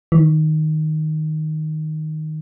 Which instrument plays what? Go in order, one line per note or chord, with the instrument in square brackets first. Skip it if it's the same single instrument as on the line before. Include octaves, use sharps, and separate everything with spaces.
[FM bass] E3
D#3